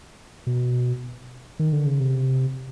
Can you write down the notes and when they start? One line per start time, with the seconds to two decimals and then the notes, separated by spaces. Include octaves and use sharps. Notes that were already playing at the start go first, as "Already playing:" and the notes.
0.47 B2
1.59 D#3
1.73 D3
1.86 C#3
2.00 C3